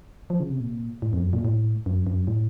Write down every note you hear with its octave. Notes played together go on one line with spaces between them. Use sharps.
F3
C#3
C3
A#2
A2
F2
F#2
A#2
A2
F#2
F#2
A2